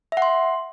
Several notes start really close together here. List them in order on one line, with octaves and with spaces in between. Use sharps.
E5 F#5 C6